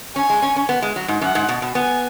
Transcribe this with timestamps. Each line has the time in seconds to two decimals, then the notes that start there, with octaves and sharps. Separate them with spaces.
0.16 C#4 G#5
0.30 G#3
0.42 C#4
0.56 C#4
0.69 B3
0.82 G#3
0.96 F#3
1.08 G#2
1.21 F#2 F#5
1.35 G#2
1.49 B2
1.62 B2
1.75 B3 G#5